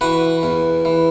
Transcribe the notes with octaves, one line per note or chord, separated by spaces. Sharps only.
E3 F#4 B4
E2
E3